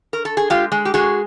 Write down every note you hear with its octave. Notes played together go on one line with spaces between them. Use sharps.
A#4
A4
G#4
G#3 F4 G4
G#3
G4
G#3 F#4 G#4